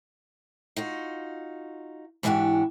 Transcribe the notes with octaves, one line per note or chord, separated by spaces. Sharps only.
D#4 F4 F#4
G#2 E3 D4 D#4 F#4 G4